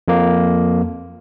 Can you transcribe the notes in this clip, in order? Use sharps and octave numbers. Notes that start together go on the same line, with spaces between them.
F2 A#3